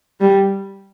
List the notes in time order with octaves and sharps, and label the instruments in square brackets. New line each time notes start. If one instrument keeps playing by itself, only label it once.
[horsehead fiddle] G3